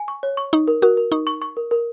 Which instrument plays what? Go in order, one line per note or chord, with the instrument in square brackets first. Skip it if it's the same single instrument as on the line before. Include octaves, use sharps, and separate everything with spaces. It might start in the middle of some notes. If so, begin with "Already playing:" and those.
Already playing: [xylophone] G#5
C#6
C#5
C#6
[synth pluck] D#4 [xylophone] C#6
[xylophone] A#4
[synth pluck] F#4 [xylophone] A#4
[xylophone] A#4
[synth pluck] D#4 [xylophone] C#6
[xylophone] C#6
C#6
A#4
A#4